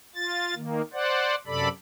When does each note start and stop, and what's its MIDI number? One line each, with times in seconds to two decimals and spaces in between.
0.15 0.54 65
0.15 0.54 93
0.56 0.82 51
0.56 0.82 58
0.93 1.35 72
0.93 1.35 74
0.93 1.35 78
1.47 1.68 42
1.47 1.68 48
1.47 1.68 69
1.47 1.68 74
1.47 1.68 83